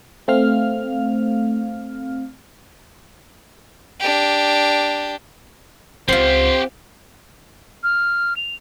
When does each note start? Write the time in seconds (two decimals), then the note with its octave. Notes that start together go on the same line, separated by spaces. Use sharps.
0.28 A3 C4 F5 F6
4.00 D4 G4
6.08 C#2 C4 F4 G4 C5 F#5
7.83 F6
8.36 F7